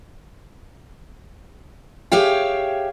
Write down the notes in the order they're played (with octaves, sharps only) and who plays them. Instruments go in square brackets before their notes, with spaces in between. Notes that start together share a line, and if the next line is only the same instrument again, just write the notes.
[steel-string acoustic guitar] G4 G#4 C#5 E5 F5 G5